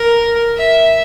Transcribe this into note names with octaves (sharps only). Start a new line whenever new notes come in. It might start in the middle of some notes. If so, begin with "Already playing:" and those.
Already playing: A#4
E5